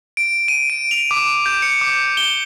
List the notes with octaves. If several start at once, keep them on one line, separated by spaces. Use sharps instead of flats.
D7
D#7
D7
F7
D6
G6
C#7
D6
G7